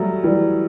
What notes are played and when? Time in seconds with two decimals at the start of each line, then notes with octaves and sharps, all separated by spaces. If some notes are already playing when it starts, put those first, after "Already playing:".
Already playing: F#3 G3 A3
0.24 E3 G3